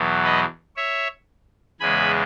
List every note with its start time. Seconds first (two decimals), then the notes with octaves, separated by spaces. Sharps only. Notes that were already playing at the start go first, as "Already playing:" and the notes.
Already playing: E2 B2 F#3
0.24 B4 D#5
0.76 C#5 E5
1.80 E2 C#3 G#3 G#5 B5